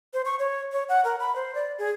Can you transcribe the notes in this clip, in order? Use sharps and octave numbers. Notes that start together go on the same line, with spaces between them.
C5
C#6
C#5
C#5
F#5
A#4
B5
C5
D5
G#4